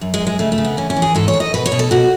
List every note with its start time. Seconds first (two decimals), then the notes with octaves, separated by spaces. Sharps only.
0.01 F#2
0.14 G#3
0.20 F#2
0.27 G#3
0.39 C#3 A3
0.52 A3
0.58 C#3
0.65 B3
0.77 E3 C#4
0.90 C#4
0.96 E3
1.02 G#4
1.15 G#2 A4
1.28 C#5
1.34 G#2
1.40 D#5
1.54 B2 B4
1.66 C#5
1.72 B2
1.79 A4
1.91 B2 F#4